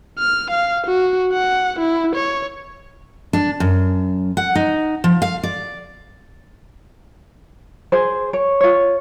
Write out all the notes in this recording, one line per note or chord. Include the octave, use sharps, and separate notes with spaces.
F6
F5
F#4
F#5
E4
C#5
D4
F#2
F#5
D#4
F3
F5
D5
G#4 C5
C#5
F4 C#5